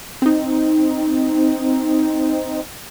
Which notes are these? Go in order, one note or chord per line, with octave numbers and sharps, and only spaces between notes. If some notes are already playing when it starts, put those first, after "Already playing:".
C4 D#4